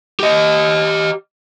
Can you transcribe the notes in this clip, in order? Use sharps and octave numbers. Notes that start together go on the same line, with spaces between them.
G4 D#5